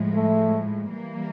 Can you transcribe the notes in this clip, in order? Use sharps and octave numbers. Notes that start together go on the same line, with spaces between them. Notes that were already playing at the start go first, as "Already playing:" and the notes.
Already playing: A2 F3 G#3
A3
E3 G3 A#3